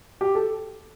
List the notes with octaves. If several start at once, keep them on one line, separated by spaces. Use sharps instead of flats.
G4
A4